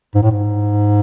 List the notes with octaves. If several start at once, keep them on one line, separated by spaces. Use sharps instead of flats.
G#2
A2
G#2